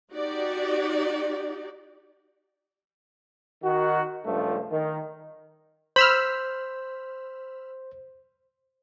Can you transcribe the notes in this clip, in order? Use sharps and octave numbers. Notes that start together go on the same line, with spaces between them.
D#4 F#4 G4 D5
D#3 F#4
C#2 G2 F3 A3
D#3
C5 B5 E6 F6